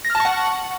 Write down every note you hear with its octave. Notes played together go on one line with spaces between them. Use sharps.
A#6
F6
A5
C#6
F#5